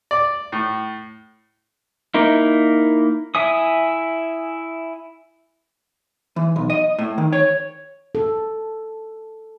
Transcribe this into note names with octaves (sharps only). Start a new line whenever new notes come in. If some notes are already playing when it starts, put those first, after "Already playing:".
D5
A2
A#3 D#4 E4
E4 E5 G#5 D#6
E3
B1
D#5
A2
D#3
C#5
A4